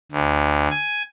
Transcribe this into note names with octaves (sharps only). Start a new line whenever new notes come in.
D2
G#5